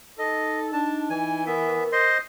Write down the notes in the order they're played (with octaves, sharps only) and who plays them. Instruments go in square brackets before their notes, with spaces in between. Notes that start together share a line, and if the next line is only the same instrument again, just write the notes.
[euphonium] D#4 [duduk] A4 [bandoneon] D#5
[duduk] D4 [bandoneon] A5
[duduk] E3 [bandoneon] G#5
[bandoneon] B3 E5 [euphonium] A#4
[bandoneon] C5 D#5 C6